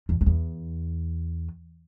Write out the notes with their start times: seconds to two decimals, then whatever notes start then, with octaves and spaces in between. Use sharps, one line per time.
0.09 E2
0.21 F#2
0.26 E2